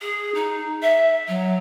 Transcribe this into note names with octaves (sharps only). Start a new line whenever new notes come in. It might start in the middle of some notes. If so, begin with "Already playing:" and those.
G#4
D#4
E5
F#3